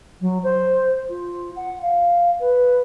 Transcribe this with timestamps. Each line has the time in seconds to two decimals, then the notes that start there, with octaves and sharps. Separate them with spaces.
0.20 F#3
0.43 C5
1.09 F4
1.56 F#5
1.82 F5
2.39 B4